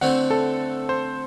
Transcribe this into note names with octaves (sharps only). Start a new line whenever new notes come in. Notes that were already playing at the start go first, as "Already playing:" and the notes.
D3 A3 C4 E4 F#5
A4
C5